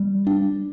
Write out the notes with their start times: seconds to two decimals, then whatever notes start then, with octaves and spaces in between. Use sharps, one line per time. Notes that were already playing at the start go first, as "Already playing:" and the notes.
Already playing: G3
0.27 D4